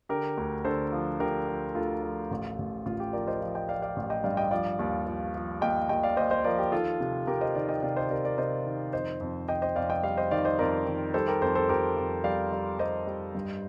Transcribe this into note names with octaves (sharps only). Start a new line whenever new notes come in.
D3 G4 A#4
D2
D3 A4 C5
F3
D3 G4 A#4
F3
D2 F4 A4
F3
A1
A1
A1 F4
G4
F3 A#4 D5
C5 D#5
F3
D#5 G5
F3 D5 F5
D5 F5
A1
D#5 G5
G2 D5 F5
D#5 G5
F3 D5 F5
D#2
F3
F3
D#2 D#5 G5
D#2 D#5 G5
D5 F5
D#2 C5 D#5
C5 D#5
F3 A#4 D5
G4
D#3 F4 A4
C3
C3 G4 A#4
C5 D#5
D#3 D5 F5
D#5 G5
C3 D5 F5
C5 D#5
C3 A#4 D5
A#4 D5
C3 C5 D#5
D#3
F2 C5 D#5
F2
F2 D#5 G5
C5 D#5
F2 D5 F5
D#5 G5
G3 D5 F5
C5 D#5
D#3 D5 F5
C5 D#5
F2 A#4 D5
D#3
G3 A4 C5
G4 A#4
F2 A4 C5
A4 C5
F2 G4 A#4
F2
G3 D5 F5
G3
G3 C5 D#5
G3
G2